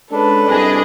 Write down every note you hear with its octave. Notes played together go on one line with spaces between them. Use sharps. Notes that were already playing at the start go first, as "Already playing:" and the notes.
G#3 C#4 D4 A4 B4
C2 D4 G#4 D#5